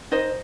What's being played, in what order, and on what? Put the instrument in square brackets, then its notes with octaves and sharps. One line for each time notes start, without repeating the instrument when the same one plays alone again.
[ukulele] D#4 C5 D#5